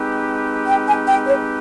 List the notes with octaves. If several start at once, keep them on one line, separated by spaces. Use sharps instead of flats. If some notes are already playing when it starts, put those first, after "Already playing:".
Already playing: G#3 C4 D#4 G4 B4
G5
G#5
G5
C#5